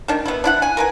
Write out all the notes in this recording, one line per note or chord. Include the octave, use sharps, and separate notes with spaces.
D#3 A3 D4
B3 E4
D4 E4 F#5
G#5
A#4 B4 G#5